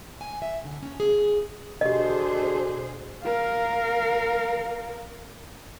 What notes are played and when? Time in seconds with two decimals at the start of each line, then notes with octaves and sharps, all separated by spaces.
0.21 G#5
0.42 E5
0.65 D3
0.83 C#4
1.00 G#4
1.81 B2 D3 G4 G#4 C5 D#5
3.24 A#4 F5